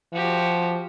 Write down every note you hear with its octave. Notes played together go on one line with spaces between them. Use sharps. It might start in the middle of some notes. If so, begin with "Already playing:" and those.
F3 F#4 G4